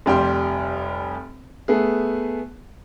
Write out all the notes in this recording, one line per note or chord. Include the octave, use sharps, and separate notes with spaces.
F1 G3 G5 C6
A3 B3 G#4